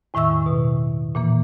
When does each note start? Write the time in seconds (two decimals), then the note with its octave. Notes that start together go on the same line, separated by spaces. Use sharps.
0.14 E2 A2 D#3 E5 C#6 E6
0.46 B2
1.15 A#2 E3 A#3